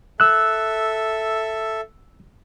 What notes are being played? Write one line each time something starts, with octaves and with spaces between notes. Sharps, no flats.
A4 E5 E6 F#6